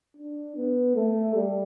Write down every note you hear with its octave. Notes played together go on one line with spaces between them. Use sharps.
D4
B3
A3
G3